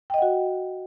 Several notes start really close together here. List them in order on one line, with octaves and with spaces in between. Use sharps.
G5 D#5 F#5 F#4